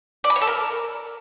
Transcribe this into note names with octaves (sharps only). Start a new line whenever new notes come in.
D5
B5
C#5
A4
A#4